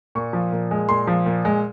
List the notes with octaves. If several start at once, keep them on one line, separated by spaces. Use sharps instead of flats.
A#2 C#6
F3
A#2
G#3
A#2 C6
F3
A#2
G#3